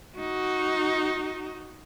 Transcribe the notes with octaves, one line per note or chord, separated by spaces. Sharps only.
D#4 F#4